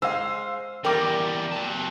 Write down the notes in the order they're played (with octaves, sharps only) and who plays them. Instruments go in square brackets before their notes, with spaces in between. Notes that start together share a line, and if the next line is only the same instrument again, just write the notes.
[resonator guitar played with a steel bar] G#3 C5 [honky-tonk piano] F5 E6
[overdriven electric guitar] E2 G3 [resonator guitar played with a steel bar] A#4 [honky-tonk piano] G5 D6 A#6
[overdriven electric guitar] F#3 A4